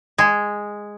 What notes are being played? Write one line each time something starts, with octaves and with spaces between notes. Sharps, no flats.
G#3